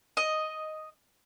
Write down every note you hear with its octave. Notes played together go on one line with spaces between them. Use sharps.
D#5